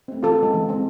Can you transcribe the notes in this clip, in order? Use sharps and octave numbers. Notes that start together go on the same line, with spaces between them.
A3 C4
E3 F4 A4
G#3 C4
E3
G#3 C4